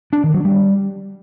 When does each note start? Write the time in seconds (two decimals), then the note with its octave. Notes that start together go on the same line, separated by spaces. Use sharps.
0.13 D4
0.23 D#3
0.34 F#3
0.45 G3